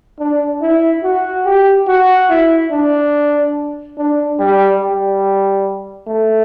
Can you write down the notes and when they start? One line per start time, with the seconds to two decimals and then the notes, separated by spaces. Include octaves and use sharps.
0.19 D4
0.61 E4
1.03 F#4
1.45 G4
1.87 F#4
2.29 E4
2.71 D4
3.97 D4
4.39 G3
4.81 G3
6.07 A3